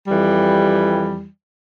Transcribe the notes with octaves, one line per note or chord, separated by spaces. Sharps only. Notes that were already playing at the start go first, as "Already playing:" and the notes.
F2 E3 G3